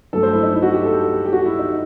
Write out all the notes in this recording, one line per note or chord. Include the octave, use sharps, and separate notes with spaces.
G2 F#3 A3 A4
C5
E4
D#4
E4
F#4
G4
A4
G4
G4
G4
F#4
E4
D#4